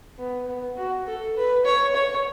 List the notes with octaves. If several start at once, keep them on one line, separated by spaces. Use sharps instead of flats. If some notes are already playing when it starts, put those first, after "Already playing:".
B3
B3
F#4
A4
B4
C#5
C#5